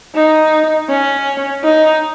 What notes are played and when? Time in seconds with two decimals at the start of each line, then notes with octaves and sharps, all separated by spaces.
0.15 D#4
0.89 C#4
1.64 D#4